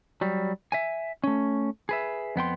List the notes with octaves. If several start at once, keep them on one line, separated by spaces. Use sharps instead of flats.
F#3 G3
E5 G#5
A3 C#4
G#4 B4 E5
F2 B3 G5 C6